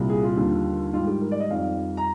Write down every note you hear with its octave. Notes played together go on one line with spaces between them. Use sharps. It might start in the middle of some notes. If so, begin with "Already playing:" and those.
Already playing: C2 A#2 G3
G#4
F4
D#2 D3 G3
G#2 D#3 G3 F4
G4
A#4
D5
D#5
F2 D#3 G3 F5
A#5